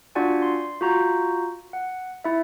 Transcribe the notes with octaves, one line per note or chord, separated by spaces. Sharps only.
D4 F4 F#4 D5 F#5 G#5
C6
F4 F#4 A#5 G6
F#5
E4 E5